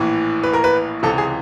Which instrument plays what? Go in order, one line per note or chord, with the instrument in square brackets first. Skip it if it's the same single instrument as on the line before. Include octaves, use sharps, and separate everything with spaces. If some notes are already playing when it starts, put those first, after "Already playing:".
Already playing: [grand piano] A#1 A2 E3
B4
A#4
B4
C#2 C3 E3 A4
G#4